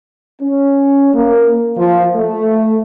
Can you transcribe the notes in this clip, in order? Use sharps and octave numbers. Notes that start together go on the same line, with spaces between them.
C#4
A#3
F3
A3